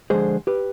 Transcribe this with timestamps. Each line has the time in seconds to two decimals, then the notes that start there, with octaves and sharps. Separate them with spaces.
0.10 D3 F3 G#3 G#4 C5
0.47 G4 B4